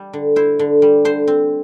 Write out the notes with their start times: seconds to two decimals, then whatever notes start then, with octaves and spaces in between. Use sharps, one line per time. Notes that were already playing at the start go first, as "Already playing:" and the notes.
Already playing: G3 D5
0.13 D3
0.36 E4 C5
0.59 D3
0.82 G3
1.05 D3 C5
1.27 C4